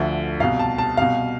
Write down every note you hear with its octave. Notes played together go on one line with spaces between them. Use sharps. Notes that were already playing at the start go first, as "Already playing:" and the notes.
Already playing: D2 D3 F3 E5
C2 B2 F5
A5
A5
C2 B2 F5